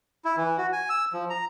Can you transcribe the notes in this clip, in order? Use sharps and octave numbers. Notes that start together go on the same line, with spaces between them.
E4
E3
F#4
G#5
E6
F3
A#5